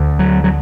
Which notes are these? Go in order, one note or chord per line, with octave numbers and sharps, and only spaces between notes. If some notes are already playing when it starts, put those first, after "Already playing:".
Already playing: D2 D3
F#3
F#3